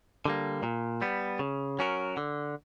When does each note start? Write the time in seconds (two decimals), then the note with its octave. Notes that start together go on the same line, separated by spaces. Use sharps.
0.25 D3 G3 A#3
0.63 A#2
1.02 G3 B3
1.39 C#3
1.79 F#3 C#4 F#4 A#4
2.17 D3